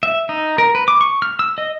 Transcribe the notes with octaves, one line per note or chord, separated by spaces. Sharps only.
E5
D#4
A#4
B4
D6
C#6
F6
E6
D#5